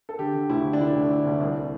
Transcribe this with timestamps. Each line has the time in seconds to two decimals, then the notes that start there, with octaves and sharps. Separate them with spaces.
0.09 A4
0.19 D3 G4
0.35 D3
0.50 D2 E4
0.65 D3
0.73 D4
0.80 D2 E4
0.95 D2
1.10 D3 E4
1.26 D2
1.40 C2